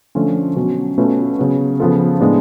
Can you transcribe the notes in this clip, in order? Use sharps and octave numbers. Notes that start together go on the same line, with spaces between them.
D3 F3 A3 C#4 F4
B2 F#3 C#4
B2 A3 C#4 F4 B4
C#3 F#3 B3
C#3 F3 B3 F4 A4
A2 G#3 B3 D4